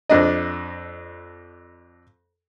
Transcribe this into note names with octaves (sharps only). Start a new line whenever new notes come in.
F2 D4 D#5